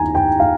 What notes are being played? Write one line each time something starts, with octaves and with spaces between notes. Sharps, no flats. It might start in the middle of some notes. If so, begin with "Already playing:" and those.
Already playing: D#2 D#3 G#5 A#5
G5
F5